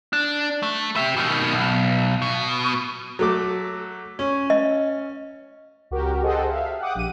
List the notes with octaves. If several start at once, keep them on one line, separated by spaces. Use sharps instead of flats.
D4
A3
G4 E5
B2 D#3
B1
B2
F#3 A3 D6
C#4
D#5
C#2 F#4 G4 A#4
G#4 A4 C5 D#5 F#5 G5
E5 F5
F#5 G5 D6 D#6
A#1 G4 D#7